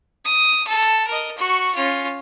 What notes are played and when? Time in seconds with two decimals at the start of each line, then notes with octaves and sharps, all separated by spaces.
0.25 D#6
0.67 A4
1.07 A#4 D#5
1.37 F#4 C#6
1.74 C#4 F4